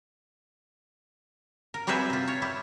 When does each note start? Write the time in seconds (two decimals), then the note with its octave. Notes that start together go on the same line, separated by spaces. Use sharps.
1.74 A#4
1.87 F#3 G3 C4 G#4 B4 E5
2.10 C3 F4
2.28 C#5
2.42 G3 E4